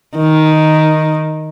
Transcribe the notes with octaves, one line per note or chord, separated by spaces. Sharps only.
D#3